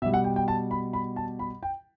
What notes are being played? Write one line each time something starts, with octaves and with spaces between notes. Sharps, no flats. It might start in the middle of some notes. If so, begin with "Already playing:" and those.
B2 G3 E5
F#5
G5
G5
A5
B5
B5
A5
B5
G5